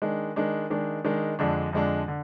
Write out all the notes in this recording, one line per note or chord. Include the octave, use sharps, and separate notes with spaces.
D#3 G#3 D4
D#3 G#3 D4
D#3 G#3 D4
D#3 G#3 D4
F2 D3 G#3 D4
F2 D3 G#3 D4
D3